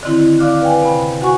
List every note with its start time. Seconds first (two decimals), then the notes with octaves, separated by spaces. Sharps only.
0.03 D3 D#3 C4 E4
0.38 D5 F5 D6 F6 F#6
0.61 B4 F5 G5 G#5
0.82 C3 B5
1.22 F#4 F#5 G#5 C#6